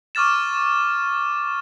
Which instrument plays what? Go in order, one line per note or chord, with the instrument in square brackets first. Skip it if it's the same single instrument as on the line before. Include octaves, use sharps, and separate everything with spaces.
[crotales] C#6 D6 F6 A6 E7